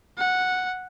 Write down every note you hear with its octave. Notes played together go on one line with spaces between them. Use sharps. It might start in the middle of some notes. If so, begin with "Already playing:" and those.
F#5